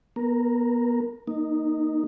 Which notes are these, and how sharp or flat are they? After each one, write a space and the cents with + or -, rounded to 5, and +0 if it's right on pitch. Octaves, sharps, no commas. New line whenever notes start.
B3 -30 A#4 +0
A#3 +0 D#4 -10